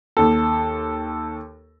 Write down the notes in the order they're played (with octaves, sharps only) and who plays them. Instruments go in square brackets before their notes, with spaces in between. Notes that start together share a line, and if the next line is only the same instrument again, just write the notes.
[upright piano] D#2 A4